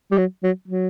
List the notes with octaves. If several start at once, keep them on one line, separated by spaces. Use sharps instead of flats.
G3
F#3
F#3
F#3